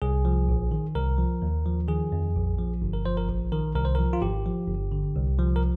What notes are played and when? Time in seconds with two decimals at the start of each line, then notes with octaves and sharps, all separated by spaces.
0.02 C2 G#4
0.25 F3
0.49 A#1
0.71 D#3
0.95 C2 A#4
1.18 F3
1.42 D#2
1.66 F3
1.88 D#3 G#4
2.12 F2
2.35 A#1
2.58 F3
2.82 G1
2.93 A#4
3.05 F3 C5
3.17 A#4
3.29 A#1
3.52 D#3 A#4
3.75 C2 A#4
3.85 C5
3.95 F3 A#4
4.13 F4
4.22 G#1 G4
4.45 F3
4.68 G1
4.92 D3
5.15 C2
5.39 F3
5.56 A#4